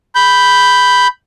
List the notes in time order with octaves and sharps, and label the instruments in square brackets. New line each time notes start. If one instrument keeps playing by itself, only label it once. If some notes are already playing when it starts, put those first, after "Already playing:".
[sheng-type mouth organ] B5 G6